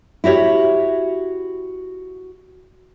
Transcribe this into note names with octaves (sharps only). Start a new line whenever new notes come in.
E4 F#4 G4 C#5